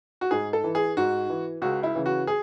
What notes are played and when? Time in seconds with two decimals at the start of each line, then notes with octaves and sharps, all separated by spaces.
0.21 F#4
0.31 G#2 G#4
0.53 A4
0.64 E3
0.75 G#4
0.97 G#2 F#4
1.30 E3
1.62 C#2 F#4
1.83 E4
1.95 C#3 E3
2.06 F#4
2.27 G#4